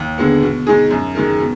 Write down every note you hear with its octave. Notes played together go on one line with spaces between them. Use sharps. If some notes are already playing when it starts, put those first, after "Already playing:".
Already playing: D#2
D3 G#3 B3
B2
G#3 D#4 G#4
F#2
D#3 G#3 D#4 A#4
B2